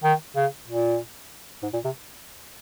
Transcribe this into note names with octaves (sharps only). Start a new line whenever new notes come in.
D#3
C#3
A#2
G#2
A#2
C3